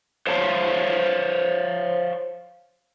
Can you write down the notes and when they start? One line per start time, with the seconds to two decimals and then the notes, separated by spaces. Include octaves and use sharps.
0.27 C5 C#5 F5 A5